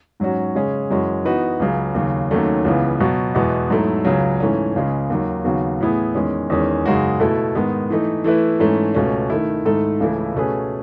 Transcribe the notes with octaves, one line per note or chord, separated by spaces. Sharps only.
G#2 F#3 C#4 F#4
C#3 G#3 C#4 G#4
F#2 E3 G#3 C#4 F#4
E3 B3 D#4 F#4 B4
C#2 C#3 F#3
D#2 C#3 F#3
D#2 D#3 F#3 A3 C#4
C#2 C#3 E3 B3
B2 F#3 B3 F#4
E2 B2 G#3 B3 E4
G#2 F#3 A3 E4
C#2 C#3 F#3
G#2 E3 A3 C#4
C#2 C#3 G#3 C#4
D#2 D#3 F#3
D#2 C#3 F#3 B3 F#4
A2 E3 B3 E4 G#4
E2 D#3 G#3 C#4
E2 D#3 G#3 C#4 G#4
F#2 C#3 G#3 D#4 F#4
B2 A3 E4 A4
G#2 D#3 G#3 B3
E3 A3 D#4
E3 A3 E4 B4
G#2 E3 A3 C#4
C#2 B2 A3 C#4
D#3 A3 E4
G#2 D#3 A3 E4 A4
C#2 C#3 E3 A3 E4
B2 A3 C#4 G#4 B4